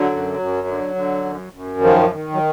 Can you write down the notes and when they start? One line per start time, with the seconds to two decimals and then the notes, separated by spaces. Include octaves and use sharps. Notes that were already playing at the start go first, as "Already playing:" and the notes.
Already playing: D3 F#3
0.11 F#2
0.39 F#2
0.67 D3
0.96 D3
1.25 F#2
1.53 F#2
1.81 D#3 F3
2.10 D#3
2.33 F#3